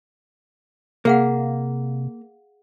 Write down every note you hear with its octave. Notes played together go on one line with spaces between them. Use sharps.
C3 A#3 G#4 F5 F#5